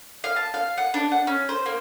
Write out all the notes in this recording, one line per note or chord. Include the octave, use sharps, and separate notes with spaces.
F5
A5
F5
F#5
D4
F#5
C#4
C5
A#3